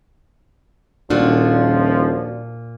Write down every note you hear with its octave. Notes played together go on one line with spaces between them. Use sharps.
D#1 A#2 F3 D4 F#4